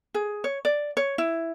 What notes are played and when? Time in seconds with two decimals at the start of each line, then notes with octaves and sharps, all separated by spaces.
0.14 G#4
0.44 C#5
0.65 D5
0.97 C#5
1.18 E4